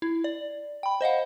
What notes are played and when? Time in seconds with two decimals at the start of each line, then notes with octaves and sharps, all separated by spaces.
0.02 E4
0.24 D5
0.83 G5 B5
1.01 C5 D#5 F5 F#5